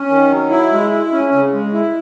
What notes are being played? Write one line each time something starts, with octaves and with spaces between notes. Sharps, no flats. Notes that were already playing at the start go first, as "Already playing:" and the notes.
Already playing: C#4
D#3
F#3
E4
G#3
E4
C#4
C#3
G#3
E4